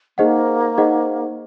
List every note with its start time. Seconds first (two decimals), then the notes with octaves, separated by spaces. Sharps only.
0.18 A#3 D#4 G#4 C5 D#5 F#5
0.78 D#4 G#4 C5 D#5 F#5